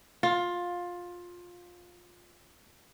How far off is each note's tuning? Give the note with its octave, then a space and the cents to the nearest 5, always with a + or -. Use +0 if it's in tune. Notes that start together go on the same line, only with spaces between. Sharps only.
F4 +15